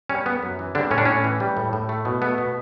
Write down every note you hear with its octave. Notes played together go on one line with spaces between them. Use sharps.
G3 C#4
B3
F#2
E3
D3 G3 D4
A2 C#4
D4
A2 C#4
E3
G3
A2
A2
A3
B2
A3 B3
B2